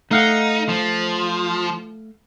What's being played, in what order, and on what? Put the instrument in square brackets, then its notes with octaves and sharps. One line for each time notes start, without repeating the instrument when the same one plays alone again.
[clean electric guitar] A3 F5 F#5 [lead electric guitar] D#4
[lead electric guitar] F3